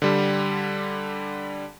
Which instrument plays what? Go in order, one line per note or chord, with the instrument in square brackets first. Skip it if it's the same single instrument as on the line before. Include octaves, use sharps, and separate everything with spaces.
[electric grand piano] D3 G3